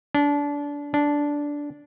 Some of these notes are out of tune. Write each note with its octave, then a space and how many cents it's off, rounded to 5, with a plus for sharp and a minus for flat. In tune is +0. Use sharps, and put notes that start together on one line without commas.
D4 -25
D4 -10